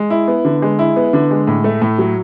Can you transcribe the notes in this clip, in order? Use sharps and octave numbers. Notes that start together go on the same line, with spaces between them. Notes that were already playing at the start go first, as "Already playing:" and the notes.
Already playing: G#3
E4
B3
D3
G#3
E4
B3
D3
G#3
A2
A3
A2
F#3